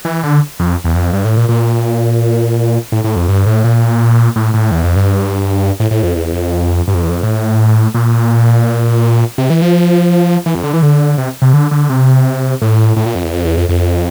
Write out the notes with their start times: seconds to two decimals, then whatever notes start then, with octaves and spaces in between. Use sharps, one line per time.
0.05 E3
0.23 D3
0.60 F2
0.84 E2
0.95 F2
1.13 G2
1.25 A2
1.37 A#2
1.49 A#2
2.92 A2
3.04 A2
3.16 F2
3.28 G2
3.46 A2
3.64 A#2
4.36 A2
4.54 A2
4.71 E2
4.84 F2
4.96 G2
5.80 A2
5.91 A2
6.03 F2
6.16 E2
6.33 F2
6.88 G2
6.94 F2
7.03 E2
7.09 F2
7.23 A2
7.95 A#2
9.38 C3
9.50 E3
9.62 F3
10.46 E3
10.55 F2
10.64 D3
10.73 E3
10.82 D3
11.18 C3
11.42 C3
11.53 D3
11.71 D3
11.90 C3
12.62 A2
12.96 A2
13.06 A#2
13.15 F2
13.24 E2
13.33 F2
13.45 E2
13.57 F2
13.69 F2